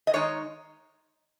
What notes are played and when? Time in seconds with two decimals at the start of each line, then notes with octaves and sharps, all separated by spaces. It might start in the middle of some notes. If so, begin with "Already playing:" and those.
0.07 D#5
0.13 D#3 G#3 D#4 C#5